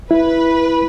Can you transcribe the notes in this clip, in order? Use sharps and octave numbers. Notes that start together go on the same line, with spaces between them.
E4 B4